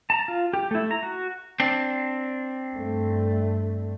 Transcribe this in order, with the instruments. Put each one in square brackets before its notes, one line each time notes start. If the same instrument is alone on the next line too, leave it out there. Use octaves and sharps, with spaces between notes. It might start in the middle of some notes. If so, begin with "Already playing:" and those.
[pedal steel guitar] A5 A#5
F4
G4
A3 E4
A#5
F#4
[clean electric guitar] C4 D4
[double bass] G2 A3